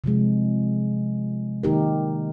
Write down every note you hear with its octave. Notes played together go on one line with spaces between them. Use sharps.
C3 F3 G#3
D#3 A#3 D#4 G4 A#4